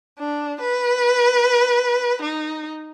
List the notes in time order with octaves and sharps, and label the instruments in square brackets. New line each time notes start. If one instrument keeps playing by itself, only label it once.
[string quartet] D4
B4
D#4